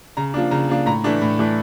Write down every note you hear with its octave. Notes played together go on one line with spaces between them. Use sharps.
C#3 A#5
F3 A#3 D4
C#3 A#5
F3 A#3 D4
A2 A#5
E3 A3 D4
A2
E3 A3 D4